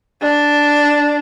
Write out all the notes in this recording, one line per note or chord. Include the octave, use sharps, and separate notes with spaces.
D4